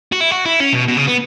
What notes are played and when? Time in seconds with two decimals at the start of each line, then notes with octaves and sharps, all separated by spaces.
0.12 F#4
0.21 E4
0.31 F#4
0.45 E4
0.60 C#4
0.73 B2
0.88 B2
0.97 C#3
1.07 B3